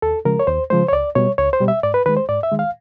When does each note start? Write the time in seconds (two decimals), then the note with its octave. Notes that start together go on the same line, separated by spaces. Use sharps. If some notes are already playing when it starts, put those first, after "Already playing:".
0.02 D#2 A4
0.25 C#3 F3 G#3 A#4
0.40 C#5
0.47 D#2 C5
0.70 C#3 F3 G#3 C5
0.88 C#5
0.92 C#2 D5
1.15 B2 G3 C#5
1.38 C#2 C#5
1.53 C5
1.61 B2 G3
1.68 E5
1.83 G#2 D5
1.94 B4
2.06 D#3 G#3 B4
2.17 C5
2.28 G#2 D5
2.43 E5
2.52 D#3 G#3
2.59 F5